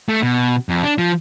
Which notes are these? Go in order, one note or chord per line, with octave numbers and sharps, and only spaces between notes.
A3
B2
F2
D4
F3